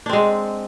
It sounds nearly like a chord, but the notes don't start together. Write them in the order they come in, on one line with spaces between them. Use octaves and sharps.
D4 C4 G#3